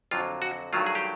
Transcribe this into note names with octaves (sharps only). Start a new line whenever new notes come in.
F2 D3 F#3 F4
F#4
G2 D#3 F#3 A3 F4
G#4
G4